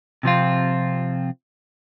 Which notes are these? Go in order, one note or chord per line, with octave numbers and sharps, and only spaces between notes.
C3 F3 C4 F4